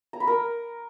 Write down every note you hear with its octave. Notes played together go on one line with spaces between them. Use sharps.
A#5
B5
A#4